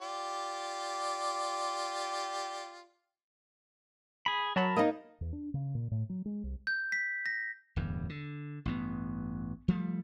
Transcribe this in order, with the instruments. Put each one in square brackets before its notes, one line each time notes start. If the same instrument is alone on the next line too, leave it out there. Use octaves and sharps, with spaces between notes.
[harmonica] F4 G4 D5
[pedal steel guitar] G#4 B5
[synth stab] F#3 [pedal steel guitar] A#4 A5 B5
[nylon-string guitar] A#3 D#4 [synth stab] D#5
[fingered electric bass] E2
D4
C#3
A#2
A2
F#3
G#3
C2
[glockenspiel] G6
B6
A#6
[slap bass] D1 E2 G2
D3
A1 G2 B3
F3 G3 A3